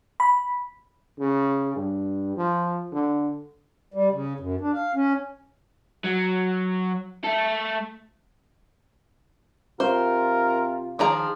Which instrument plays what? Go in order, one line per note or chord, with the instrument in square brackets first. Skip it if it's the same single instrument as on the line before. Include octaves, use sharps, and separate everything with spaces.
[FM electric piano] B5
[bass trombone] C#3
G2
F3
D3
[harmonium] G3
C#3
F#2
D4
F5
C#4
[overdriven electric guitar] F#3
A3 A4
[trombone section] C3 F4 [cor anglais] A#4 [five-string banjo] C5
[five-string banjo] D#3 G#4 A#5 [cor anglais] F3